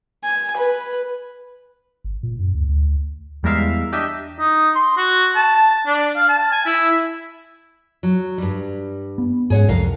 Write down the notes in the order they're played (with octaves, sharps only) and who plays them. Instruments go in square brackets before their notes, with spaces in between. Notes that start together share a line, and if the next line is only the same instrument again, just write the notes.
[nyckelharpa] G#5
B4
[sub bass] G1
A#2
F#2
D2
D2
[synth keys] E2 G3 G#3 A#4 E5 F5
D4 G4 D#5 E5
[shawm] D#4
C6
F#4
A5
D4
F5
A5
G#5
E4
[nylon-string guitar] F#3
G2 G3
[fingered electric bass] B3
[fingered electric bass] G#2 G#3 C#4 [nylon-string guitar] G#4 C#5 F#5
[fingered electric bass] C2 [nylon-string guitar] F2 A#4 F5